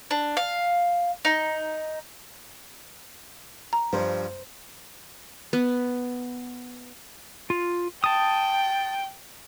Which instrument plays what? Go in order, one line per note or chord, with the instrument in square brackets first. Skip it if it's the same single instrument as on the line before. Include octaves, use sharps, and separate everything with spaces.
[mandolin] D4
F5
D#4
[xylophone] A#5
[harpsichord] G2 F3 [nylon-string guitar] C5
[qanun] B3
[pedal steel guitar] F4
[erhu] G5 [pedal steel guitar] A5 D#6